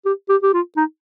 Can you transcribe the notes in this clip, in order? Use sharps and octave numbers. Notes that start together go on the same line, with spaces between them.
G4
G4
G4
F4
D#4